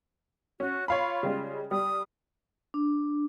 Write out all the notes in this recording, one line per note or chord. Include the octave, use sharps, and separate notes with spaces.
C#4 F#4
F4 C#5 F5 B5
C#3 G3 G#3
G3 D#6
D4